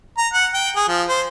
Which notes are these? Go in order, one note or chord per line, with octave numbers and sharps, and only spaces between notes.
A#5
F#5
G5
G#4
F3
C5